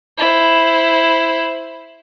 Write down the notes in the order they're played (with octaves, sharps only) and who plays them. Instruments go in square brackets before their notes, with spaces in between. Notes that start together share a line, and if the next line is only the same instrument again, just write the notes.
[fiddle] E4 C5